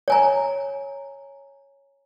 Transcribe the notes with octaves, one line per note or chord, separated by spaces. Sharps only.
C#5 G#5 A#5